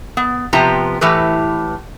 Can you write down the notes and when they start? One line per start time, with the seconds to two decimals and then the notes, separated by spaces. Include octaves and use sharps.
0.17 B3
0.53 C3 F3 B3 G4 A#5
1.01 A2 E3 G4 B4